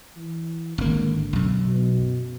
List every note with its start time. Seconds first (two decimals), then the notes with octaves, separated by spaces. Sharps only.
0.16 E3
0.78 G#1 D3 A#3
1.33 B1 F#2
1.68 B2